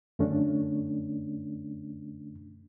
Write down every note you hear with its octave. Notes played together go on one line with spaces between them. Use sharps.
F#2 D3 A3 C#4 D4